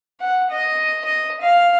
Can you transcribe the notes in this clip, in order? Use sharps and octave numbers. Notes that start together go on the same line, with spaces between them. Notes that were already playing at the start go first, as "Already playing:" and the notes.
F#5
D#5
D#5
F5